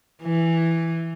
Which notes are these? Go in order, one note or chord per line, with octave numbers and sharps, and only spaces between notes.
E3